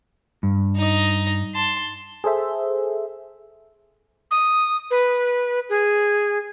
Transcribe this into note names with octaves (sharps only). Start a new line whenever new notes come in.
G2
D#4 D#5
A5 C6
G#4 A4 C5 E5
D#6
B4
G#4